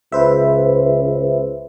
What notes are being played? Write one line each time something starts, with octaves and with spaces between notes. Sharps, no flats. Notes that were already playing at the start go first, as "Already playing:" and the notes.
C#2 B4 C5 E5